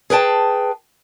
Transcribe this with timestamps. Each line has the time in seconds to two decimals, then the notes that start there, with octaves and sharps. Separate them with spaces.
0.10 G#4 B4 G5 A5